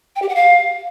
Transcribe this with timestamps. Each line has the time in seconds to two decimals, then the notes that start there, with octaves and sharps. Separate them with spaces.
0.16 G5
0.22 G4
0.29 F#5
0.35 F5